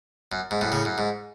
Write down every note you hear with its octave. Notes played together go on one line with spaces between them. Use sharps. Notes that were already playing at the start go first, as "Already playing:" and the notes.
F#2
G#2
F#2 A2
A2 C#3
F#2
G#2